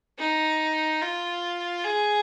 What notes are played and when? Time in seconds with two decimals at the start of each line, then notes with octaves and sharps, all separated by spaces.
0.19 D#4
1.01 F4
1.84 G#4